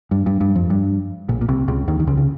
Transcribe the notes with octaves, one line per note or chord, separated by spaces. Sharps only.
G2
G2
G2
F2
G2
A#1 A#2
A#2
C2 C3
C#2 C#3
D#2 D#3
D#3
C#2 C#3
C#3